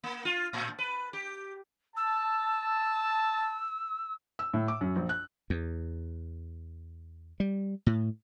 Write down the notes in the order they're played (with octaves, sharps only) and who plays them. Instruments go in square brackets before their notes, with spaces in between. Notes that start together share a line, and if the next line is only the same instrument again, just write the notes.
[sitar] A#3
F4
A2
B4
G4
[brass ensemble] A5 [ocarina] E6
[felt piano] E6
A2
D6
F#2
A#1
F#6
[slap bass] E2
G3
A2